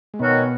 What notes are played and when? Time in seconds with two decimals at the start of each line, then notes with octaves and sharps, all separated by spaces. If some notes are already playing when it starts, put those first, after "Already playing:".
0.14 G#3
0.19 B2 D#3 F#3 B3 C#4 F#4